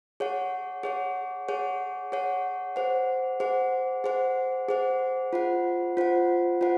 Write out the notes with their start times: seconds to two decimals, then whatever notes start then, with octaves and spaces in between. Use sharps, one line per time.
0.20 G#4 C#5 F#5
0.83 G#4 C#5 F#5
1.49 G#4 C#5 F#5
2.12 G#4 C#5 F#5
2.76 G#4 C5 F#5
3.40 G#4 C5 F#5
4.04 G#4 C5 F#5
4.69 G#4 C5 F#5
5.33 F4 C5 F#5
5.97 F4 C5 F#5
6.61 F4 C5 F#5